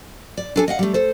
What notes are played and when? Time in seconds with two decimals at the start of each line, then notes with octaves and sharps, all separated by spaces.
0.37 D5
0.56 D4 A4 G#5
0.68 D#5 F5 F#5
0.79 G3 A3
0.94 A4 C5